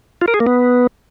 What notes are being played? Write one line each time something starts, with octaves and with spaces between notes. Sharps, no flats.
F4
A#4
G#4
A#3
B3